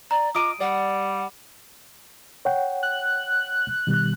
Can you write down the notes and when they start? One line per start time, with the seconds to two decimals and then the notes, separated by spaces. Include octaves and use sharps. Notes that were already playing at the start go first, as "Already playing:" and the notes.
0.11 D5 A#5
0.35 F4 D#5 A#5 D6 D#6 D7 D#7
0.60 G3 D5 F#5
2.45 C#5 F#5 G5
2.83 F#6
3.87 B2 D#3 G3